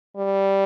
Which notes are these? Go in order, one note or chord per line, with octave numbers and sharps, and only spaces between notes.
G3